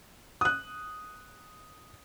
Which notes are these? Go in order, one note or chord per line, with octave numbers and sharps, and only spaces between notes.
D#6 F#6